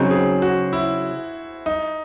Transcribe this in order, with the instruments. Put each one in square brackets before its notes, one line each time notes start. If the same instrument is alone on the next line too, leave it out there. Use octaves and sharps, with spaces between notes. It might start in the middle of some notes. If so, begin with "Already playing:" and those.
Already playing: [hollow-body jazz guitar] C#3 F#3 C4 D#4 [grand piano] C5
[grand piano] G#4
F#4
E4
D#4